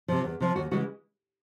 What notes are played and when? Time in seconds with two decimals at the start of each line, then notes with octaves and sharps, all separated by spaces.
0.08 C3 F3
0.24 E2
0.40 C3 F3
0.56 D#2 F#4
0.71 C#3 E3 G#3 F#4